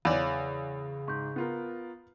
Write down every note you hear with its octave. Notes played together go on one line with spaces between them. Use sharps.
E2 C#3 C#5 D5 F5
G#2 C#6 G6
B3 F4 A#4